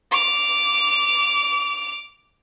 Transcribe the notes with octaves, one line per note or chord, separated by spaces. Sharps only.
D6 F7